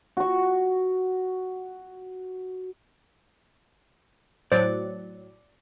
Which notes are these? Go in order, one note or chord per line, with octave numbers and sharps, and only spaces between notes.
F#4 C#6
A2 F#3 C5 D5